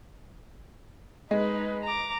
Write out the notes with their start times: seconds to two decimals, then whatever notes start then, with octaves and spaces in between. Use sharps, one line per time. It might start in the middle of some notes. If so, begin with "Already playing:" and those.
1.31 G#3 D#4 B4
1.84 A#5 D6